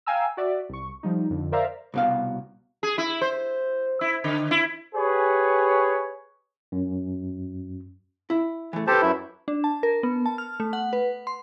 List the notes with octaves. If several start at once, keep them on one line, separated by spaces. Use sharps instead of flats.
F5 G5 G#5 A#5 E6
F#4 D5 E5
C2 C#6
F3 G3 D#4
F2 D3
A#4 C5 D5 E5 F5 A#5
C2 B2 F5
G#4
E4
C5
E4
D3
E4
G4 G#4 B4 C#5
F#2
E4
E3 A3
G4 A4 B4 C5 A5
F#2 E4
D4
A5
A#4
B3
A5
F6
A3
F#5
B4
C6